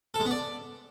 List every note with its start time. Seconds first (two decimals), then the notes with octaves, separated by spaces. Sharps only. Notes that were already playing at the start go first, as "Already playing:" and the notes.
0.14 A4
0.20 G#3
0.25 B3
0.31 D5